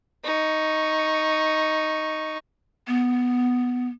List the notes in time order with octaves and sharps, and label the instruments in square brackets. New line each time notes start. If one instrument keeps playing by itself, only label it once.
[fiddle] D#4 C#6
[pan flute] B3